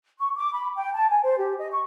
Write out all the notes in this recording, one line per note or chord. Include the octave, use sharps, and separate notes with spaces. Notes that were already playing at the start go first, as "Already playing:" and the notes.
C#6
D6
B5
G5
A5
G#5
C5
G4
D#5
C#6